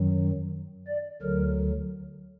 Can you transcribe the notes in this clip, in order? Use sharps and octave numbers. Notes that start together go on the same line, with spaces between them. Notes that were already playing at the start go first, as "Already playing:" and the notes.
Already playing: F#2 D#3 F#3
D5
D2 D3 F#3 A#4